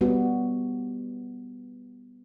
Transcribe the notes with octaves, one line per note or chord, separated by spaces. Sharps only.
G3 B3 F#4